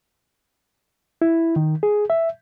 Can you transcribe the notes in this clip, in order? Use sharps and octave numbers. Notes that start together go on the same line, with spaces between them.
E4
D#3
G#4
E5